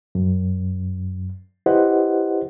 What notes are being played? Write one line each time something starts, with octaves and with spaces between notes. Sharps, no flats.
F#2
E4 G4 B4 C5 D#5 F#5